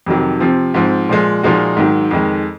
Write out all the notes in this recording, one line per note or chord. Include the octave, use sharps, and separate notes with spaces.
F2 C3 D#3 F#3
C3 F3 C4
G#2 F3 C4
A#2 F3 G#3
A#2 F3 G#3 D#4 F#4
G#2 D#3 F#3
F2 D#3 G#3